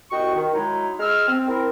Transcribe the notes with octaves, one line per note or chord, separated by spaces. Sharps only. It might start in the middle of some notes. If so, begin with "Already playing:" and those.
C2 F#4 D#5 G5 C#6
D#3
F#3 G#3 D#4 E4
G#3 E6 F6
C4
C4 E4 A#4